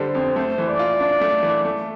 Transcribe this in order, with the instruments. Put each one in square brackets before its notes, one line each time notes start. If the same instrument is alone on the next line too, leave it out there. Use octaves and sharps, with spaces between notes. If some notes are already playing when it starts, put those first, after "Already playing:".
Already playing: [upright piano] D3 G3 [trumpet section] C5
[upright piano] F2
[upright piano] A3 [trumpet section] C5
[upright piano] E3
[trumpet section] D5
[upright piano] F4
D4
A3
E3
A3